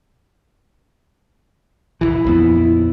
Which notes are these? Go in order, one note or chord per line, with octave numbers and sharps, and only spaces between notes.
D#1 A#1 E3 E4
A#1 F2 B3